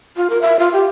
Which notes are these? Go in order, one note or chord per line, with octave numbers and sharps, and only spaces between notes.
F4
A#4
E5
F4
G4